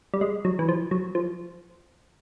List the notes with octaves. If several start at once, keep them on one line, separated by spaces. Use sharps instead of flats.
G3
G#3
F#3
E3
F3
F#3
F3